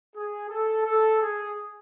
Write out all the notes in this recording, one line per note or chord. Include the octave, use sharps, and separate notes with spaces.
G#4
A4
A4
G#4